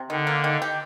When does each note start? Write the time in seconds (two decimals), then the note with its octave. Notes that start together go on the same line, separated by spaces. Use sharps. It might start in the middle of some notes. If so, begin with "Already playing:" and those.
Already playing: C3
0.10 D3 D#3
0.27 A#3
0.44 D#3
0.62 G4